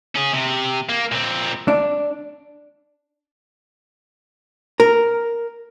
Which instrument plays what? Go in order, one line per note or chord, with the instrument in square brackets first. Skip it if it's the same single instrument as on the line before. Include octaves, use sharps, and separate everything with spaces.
[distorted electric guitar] C#4 G#4
C3
A#3
A#2 C4
[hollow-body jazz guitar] D4
A#4